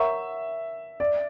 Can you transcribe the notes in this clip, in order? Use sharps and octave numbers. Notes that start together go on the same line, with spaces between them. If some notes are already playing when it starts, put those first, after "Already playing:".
Already playing: A#4 C#5 E5 F#5 A#5 C#6
D5